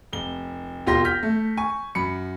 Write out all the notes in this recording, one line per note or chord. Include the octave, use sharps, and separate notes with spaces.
F1 G7
E1 F4 G4 C6 A#6
F6 G6 B6
A3
G#5 C#6
F#2 B5 C#7